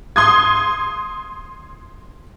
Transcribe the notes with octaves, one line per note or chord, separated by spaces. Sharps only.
C6 D#6 G#6